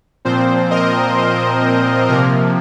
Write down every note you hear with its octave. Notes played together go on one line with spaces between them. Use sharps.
A#2 F3 C4 C5
A#4 D#5
C5
C3 F3 A#3 A#4